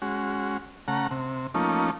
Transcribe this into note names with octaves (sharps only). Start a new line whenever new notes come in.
G#3 C#4 F#4
C#3 A3 F#5 A#5
C3
F3 A3 A#3 C#4 D#4